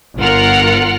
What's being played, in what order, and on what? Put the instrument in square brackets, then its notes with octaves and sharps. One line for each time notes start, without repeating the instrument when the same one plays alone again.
[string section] G1 F4 A#4 F#5 F6